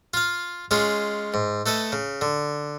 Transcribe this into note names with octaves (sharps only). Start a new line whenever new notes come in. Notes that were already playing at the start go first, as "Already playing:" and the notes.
F4 F5
G#3 C#4 F4 G#4
G#2
A3 A4 B4 D#5
C#3
D3